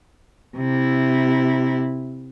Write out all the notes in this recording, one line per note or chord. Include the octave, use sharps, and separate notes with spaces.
C3 E4